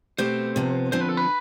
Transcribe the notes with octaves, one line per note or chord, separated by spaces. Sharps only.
B2 A3 C4 G4 C5
C3 F3 B3
D3 F3 C4 C5
B4
A4
B4